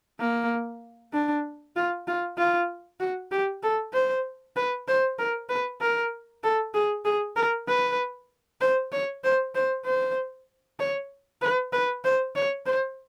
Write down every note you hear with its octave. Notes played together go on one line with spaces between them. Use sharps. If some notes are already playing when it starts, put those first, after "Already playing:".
A#3
D4
F4
F4
F4
F#4
G4
A4
C5
B4
C5
A#4
B4
A#4
A4
G#4
G#4
A#4
B4
C5
C#5
C5
C5
C5
C#5
B4
B4
C5
C#5
C5